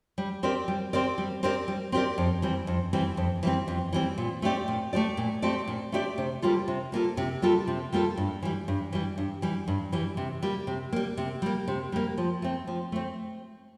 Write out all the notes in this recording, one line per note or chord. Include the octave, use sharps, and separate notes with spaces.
G3
C4 G4 A#4 D5
G3
C4 G4 A#4 D5
G3
C4 G4 A#4 D5
G3
C4 G4 A#4 D5
F2
E3 G3 C4
F2
E3 G3 C4
F2
E3 G3 C4
F2
E3 G3 C4
A#2
A3 C4 G4 D5
A#2
A3 C4 G4 D5
A#2
A3 C4 G4 D5
A#2
A3 C4 G4 D5
C3
G3 A#3 F4 A4
C3
G3 A#3 F4 A4
C3
G3 A#3 F4 A4
C3
G3 A#3 F4 A4
G2
E3 G3
G2
E3 G3
G2
E3 G3
G2
E3 G3
C3
G3 A#3
C3
G3 A#3
C3
G3 A#3
C3
G3 A#3
F3
A3 C4
F3
A3 C4